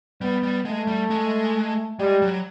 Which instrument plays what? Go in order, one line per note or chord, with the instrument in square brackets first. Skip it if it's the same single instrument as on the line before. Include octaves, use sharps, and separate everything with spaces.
[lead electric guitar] G3 [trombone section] B3
[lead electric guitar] G3
[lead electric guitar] G#3 [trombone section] A3
[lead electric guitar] G3
G#3
[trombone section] G3 [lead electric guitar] G#3
[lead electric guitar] F#3